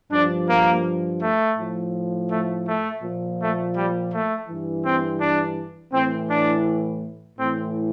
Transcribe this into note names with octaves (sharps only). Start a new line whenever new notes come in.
G2 F3 D4
A#3
A3
A2 F3
A3
A3
A#2 F3
A3
G3
A3
G2 E3
C4
D4
A2 E3 C4
D4
A2 E3 C4